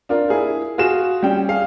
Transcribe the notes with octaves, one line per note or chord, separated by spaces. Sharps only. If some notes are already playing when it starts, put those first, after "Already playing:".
D4 F4 A#4
E4 G#4 A#4
F4 F#4 G#4 E7
G3 C#4 G5
G#4 F5